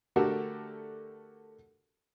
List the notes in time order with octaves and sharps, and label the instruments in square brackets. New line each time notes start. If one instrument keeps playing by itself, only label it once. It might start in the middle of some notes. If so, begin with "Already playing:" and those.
[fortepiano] D3 A3 F#4 G4 A4 A#4